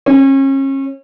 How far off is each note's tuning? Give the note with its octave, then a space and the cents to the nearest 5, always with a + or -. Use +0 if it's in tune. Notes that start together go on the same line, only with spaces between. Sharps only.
C#4 -35